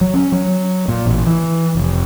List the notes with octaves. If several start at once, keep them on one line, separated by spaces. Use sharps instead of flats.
F#3
C#4
F#3
A#2
A1
E3
F1